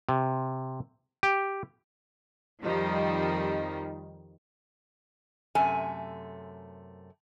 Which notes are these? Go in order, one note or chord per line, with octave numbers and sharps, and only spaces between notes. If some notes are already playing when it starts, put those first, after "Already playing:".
C3
G4
F2 D#3 F3 G3 D#4
F#2 C3 A3 G#5